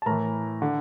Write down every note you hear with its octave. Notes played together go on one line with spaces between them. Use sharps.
A5
A2 E3 A#4 A#5
D3